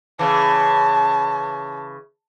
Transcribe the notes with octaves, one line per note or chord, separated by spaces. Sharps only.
C#3 E3 A5